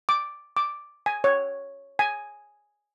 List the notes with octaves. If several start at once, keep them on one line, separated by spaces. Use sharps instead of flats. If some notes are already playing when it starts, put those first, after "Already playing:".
D6
D6
G#5
C#5
G#5